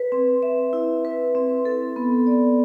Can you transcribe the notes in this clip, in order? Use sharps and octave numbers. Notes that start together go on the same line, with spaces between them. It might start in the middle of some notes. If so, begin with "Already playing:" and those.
Already playing: B4
C4
E5
E4
B4
C4
A4
B3
D5